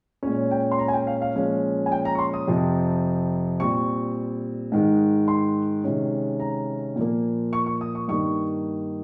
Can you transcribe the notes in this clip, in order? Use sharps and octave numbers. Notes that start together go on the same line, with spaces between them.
A#2 G#3 C#4 C#5
G5
C6
A#5
G#5
G5
F5
F5
A#2 F3 G#3 C#4
G#5
G5
A#5
C#6
C6
D#6
F2 C3 F3 C4
A#2 G3 C4 C#6
G#2 D#3 G#3
C6
C3 D#3 G#3 C#4
A#5
A#2 F3 A#3
C#6
C#6
D#6
C#6
G2 D#3 G3 A#3 C#6